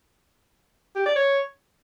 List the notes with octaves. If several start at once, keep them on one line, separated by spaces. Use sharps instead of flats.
G4
D5
C#5